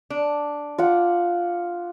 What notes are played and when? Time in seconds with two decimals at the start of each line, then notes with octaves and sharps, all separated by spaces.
0.10 D4
0.78 F4 F#5 D6